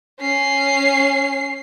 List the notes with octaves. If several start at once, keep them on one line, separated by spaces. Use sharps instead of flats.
C#4 C7